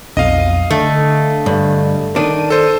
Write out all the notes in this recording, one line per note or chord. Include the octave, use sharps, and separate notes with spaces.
B1 F2 D#5 F5 D#7
D3 A3
G2
D#3 D4 D#7
A4 C5